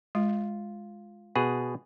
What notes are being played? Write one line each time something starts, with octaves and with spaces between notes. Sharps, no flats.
G#3 F4
B2 G#4 F#5